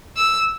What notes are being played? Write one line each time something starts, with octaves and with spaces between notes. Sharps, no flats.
E6